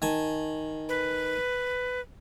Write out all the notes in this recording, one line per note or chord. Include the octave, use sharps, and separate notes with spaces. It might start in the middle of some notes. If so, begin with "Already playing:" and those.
D#3 G#5 A5
B4